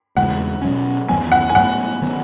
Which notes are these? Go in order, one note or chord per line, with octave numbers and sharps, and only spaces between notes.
E2 C#3 G#3 F#5
B2 F#3 C#4
E2 D#3 F#3 B3 G#5
F#5
G#5
A2 F#3 B3 F#5
D#3 F#3 B3